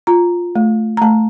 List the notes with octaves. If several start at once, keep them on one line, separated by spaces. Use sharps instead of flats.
F4 A#5
A3
A#5
A3 A5